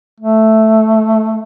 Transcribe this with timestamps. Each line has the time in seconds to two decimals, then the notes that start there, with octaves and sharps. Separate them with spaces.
0.20 A3